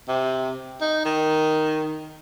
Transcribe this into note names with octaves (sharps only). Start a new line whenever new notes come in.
C3
D#4
D#3